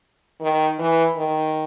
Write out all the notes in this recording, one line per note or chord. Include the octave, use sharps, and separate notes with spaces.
D#3
E3
D#3